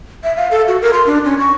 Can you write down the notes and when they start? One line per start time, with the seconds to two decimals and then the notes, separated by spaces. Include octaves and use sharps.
0.24 E5
0.37 F5
0.51 A4
0.68 F#4
0.82 A#4
0.93 C6
1.06 D4
1.25 C#4
1.39 C#6